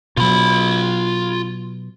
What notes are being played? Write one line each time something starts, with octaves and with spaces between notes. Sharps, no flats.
B2 F#3 F4 B5